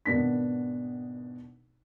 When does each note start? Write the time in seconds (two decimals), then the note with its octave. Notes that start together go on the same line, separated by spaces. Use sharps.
0.06 G#1 B2 B3 D4 A#4 B6